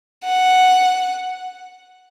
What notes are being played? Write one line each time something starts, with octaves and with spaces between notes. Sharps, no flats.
F#5